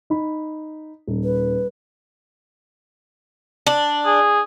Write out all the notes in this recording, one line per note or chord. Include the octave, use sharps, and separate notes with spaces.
D#4 B5
D#1
B4
D4
G#4